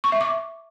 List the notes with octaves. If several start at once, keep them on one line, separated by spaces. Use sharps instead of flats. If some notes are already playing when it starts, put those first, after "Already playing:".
C#6
E5
D6